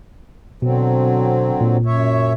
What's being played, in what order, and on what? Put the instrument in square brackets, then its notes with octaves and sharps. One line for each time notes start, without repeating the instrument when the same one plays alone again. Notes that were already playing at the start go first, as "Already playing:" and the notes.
[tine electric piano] B2 [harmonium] D3 F#3 C4
[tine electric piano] A#2
[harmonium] F#2 C#5 E5